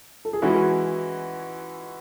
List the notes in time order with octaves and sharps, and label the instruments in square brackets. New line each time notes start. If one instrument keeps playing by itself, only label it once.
[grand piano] A4
G#4
[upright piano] E3 G#3 C#4 E4 [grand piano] F#4